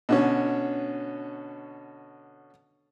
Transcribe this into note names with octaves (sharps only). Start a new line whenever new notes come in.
B2 D3 C#4